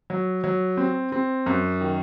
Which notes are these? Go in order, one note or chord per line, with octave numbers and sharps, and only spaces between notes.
F#3
F#3
C4
C4
F#2
D#3